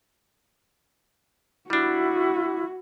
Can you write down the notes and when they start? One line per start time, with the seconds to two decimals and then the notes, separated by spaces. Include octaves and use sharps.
1.70 G3 D4 E4 F#4